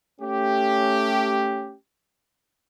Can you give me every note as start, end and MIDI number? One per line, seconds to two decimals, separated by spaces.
0.21 1.74 57
0.21 1.74 61
0.21 1.74 67